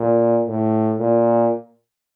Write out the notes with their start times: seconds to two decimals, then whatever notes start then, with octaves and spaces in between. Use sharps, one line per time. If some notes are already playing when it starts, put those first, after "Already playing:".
Already playing: A#2
0.46 A2
0.99 A#2